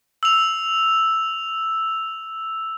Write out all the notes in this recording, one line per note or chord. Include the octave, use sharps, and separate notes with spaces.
E6 F7